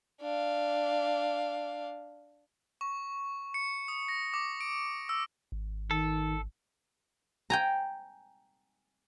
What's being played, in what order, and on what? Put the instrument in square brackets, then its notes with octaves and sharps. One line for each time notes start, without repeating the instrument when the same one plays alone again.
[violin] D4 F5
[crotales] C#6
C#7
D#6
A#6
D6
D7
E6
[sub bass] G#1
[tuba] D#3 [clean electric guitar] A4
[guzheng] G5 G#5 A#5